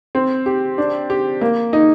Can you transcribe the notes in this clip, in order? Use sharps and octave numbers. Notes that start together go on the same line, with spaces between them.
C4
G4
D4
G4
A#3
D#4